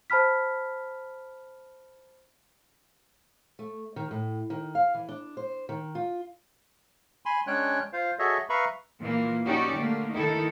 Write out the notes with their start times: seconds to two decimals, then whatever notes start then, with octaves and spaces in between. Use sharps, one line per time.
0.10 C5 A5 B5 F6 B6
3.59 A3
3.96 D#3
4.11 A2
4.50 D#3
4.75 F5
4.95 E3
5.09 D4
5.37 C5
5.69 D#3
5.95 F4
7.26 G#5 B5 C6
7.47 G#3 C#4 D4 C#5 G5 F#6
7.93 F4 C5 F5
8.19 F#4 G#4 A4 C#5 D#5 E5
8.49 B4 E5 F5 A#5 B5 C#6
9.00 A#2 E3 A#3
9.45 C#4 D#4 F#4 G4 C#5 D5
9.76 D3 A3 A#3
10.11 D#3 D#4 E4 A4